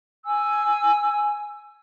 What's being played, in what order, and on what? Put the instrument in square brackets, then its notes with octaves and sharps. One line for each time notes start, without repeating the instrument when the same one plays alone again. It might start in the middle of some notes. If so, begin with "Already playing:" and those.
[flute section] G#5 E6